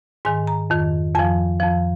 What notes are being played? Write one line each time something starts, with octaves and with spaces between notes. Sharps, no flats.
G#2 D#3 G#5
A#5
F2 D#3
F2 F3 G#5
F2 F3